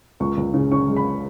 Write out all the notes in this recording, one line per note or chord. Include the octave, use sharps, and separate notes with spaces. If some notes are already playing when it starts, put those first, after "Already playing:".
C#2 C#6
C#2
C#3
C#4 C#6
G#3
B5